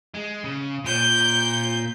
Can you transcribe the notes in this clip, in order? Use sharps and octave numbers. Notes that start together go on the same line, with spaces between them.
G#3
C#3
A#2 G6